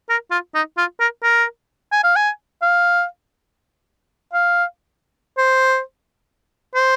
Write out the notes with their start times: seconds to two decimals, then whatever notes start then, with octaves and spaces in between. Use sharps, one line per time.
0.09 A#4
0.31 F4
0.55 D#4
0.77 F4
1.00 A#4
1.23 A#4
1.92 G#5
2.04 F5
2.16 G#5
2.62 F5
4.33 F5
5.38 C5
6.75 C5